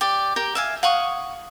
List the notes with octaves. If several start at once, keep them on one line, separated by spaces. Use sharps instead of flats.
G4 D5
G4 A#4 G5
E5 F5 G#5
F5 F#5 C#6 D#6